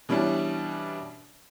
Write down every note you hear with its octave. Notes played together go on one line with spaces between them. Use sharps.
B2 E3 G3 C#4 D4